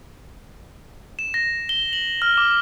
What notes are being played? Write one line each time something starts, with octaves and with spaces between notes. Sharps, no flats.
E7
A#6
G7
F#7
F6
D6